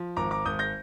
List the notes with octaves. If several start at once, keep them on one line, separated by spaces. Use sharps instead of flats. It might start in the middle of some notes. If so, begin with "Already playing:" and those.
Already playing: F3
G#1 A#5 D6
A#5 D6
G#1 D#6 G6
G6 A#6